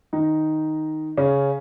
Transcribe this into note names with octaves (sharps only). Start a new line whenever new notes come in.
D#3 D#4
C#3 C#4